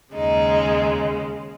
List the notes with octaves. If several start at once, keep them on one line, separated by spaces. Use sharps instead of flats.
D#2 C#3 G#3 D#4